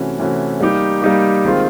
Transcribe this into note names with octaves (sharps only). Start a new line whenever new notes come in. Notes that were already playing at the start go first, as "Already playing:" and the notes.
Already playing: C3 E3 A3 C#4 F#4
C3 E3 A3 C#4 F#4
G3 A#3 D#4 G4
G3 A#3 D#4 G4
D#3 G#3 C4 F4